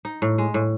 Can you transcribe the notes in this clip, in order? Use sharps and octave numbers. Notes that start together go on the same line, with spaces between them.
D#4
A2
G#3
A2